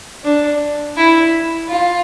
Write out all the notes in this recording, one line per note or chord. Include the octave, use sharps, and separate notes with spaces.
D4
E4
F4